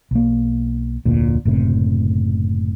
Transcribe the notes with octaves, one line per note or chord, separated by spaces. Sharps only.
B1 A#3
F1 D2 A#2
F#1 A2 C3